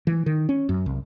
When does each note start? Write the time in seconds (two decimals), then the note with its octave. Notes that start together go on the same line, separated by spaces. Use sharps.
0.07 E3
0.26 D#3
0.49 C#4
0.69 F#2
0.86 C2